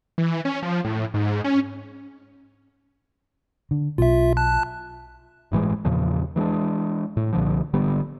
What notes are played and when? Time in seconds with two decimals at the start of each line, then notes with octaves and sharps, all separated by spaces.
0.18 E3
0.45 C#4
0.62 F3
0.85 A2
1.14 G#2
1.44 C#4
3.71 D3
3.98 B1 B2 F4 E5
4.37 A5 F#6
5.52 G1 A2 E3 G#3
5.85 E2 A#2 C#3 F3
6.36 E3 G#3 B3 D4
7.17 A2
7.33 C2 A#2 D3 F3
7.73 G#1 D3 G3 B3